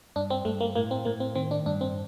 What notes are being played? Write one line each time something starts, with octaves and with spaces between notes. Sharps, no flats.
G2 D4
C4
G2 A3
A#3
A2 A#3
C4
A2 A#3
C4
D#3 C4
D4
G2 D4
C4